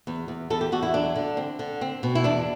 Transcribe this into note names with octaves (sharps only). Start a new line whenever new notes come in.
E2
E2
E2 A4
G4
E2 F#4
E4
F#3 D4
D3
C4
D3
C4
B2
E4
E2 D4